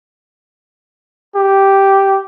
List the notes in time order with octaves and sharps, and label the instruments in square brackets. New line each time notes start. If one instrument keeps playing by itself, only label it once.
[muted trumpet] G4